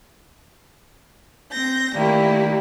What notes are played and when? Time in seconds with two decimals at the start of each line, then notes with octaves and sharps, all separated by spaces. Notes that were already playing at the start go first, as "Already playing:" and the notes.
1.52 C4 G6 A#6
1.94 D#3 G3 A3 A#3 E4 G4